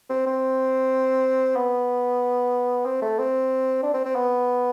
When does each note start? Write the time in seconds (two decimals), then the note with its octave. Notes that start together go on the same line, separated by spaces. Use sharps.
0.10 C4
0.26 C4
1.56 B3
2.86 C4
3.02 A3
3.18 C4
3.83 D4
3.94 C4
4.05 C4
4.15 B3